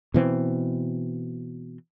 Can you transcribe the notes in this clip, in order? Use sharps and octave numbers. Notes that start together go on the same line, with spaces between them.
B2 E3 C4